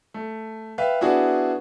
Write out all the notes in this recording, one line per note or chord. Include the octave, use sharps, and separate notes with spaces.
A3
B4 E5 F5 G5
B3 D4 E4 F#4 G#4